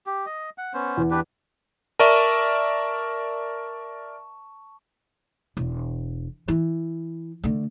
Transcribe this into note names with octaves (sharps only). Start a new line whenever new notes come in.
G4
D#5
F#5
B3 C#4 C5
E2
D4 G4 B4
A#4 D5 E5 A5 C#6 E7
E1
E3
D3 A3